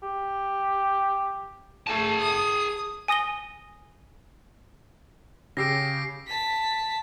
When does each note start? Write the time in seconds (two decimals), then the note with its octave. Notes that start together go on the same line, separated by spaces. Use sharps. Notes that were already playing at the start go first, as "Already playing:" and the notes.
0.03 G4
1.87 A3 G#4 A5
2.20 D#6
3.08 G#5 D#6 A#6 D#7 G7
5.57 C#3 G4 E6 A#6 C7 D7
6.27 A5 B6